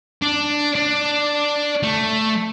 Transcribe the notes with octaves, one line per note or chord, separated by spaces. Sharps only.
D4
D4
A3